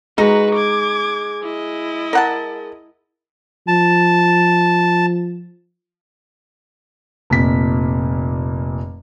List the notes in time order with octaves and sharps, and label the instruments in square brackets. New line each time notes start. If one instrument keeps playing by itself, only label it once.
[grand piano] G#3 [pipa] D#4 A#5 [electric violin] F#4 B4
[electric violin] D6 G#6
E4 D#5
[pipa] A#4 F#5 A5
[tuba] F3 [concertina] A5
[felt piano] F1 A#2 B6